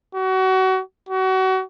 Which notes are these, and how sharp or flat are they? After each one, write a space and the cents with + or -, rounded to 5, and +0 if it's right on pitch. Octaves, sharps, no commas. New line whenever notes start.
F#4 +30
F#4 +30